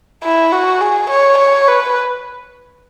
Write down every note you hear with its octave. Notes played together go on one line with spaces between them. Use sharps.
E4
F#4
G#4
C#5
C#5
B4